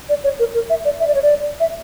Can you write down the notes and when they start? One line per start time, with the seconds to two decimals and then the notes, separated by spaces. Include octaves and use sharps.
0.09 D5
0.24 C#5
0.39 A#4
0.54 A#4
0.70 E5
0.85 D5
1.00 E5
1.08 D5
1.15 C#5
1.23 D5
1.60 E5